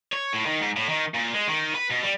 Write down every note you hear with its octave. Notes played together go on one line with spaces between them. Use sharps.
C#5
A2
D#3
G#2
A2
D#3
A#2
G#3
D#3
B4
B2
G3